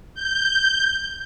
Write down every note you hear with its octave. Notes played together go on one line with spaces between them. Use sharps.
G6